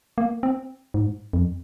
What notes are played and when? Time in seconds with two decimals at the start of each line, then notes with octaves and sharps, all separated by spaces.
0.18 A#3
0.43 C4
0.94 G#2
1.33 F2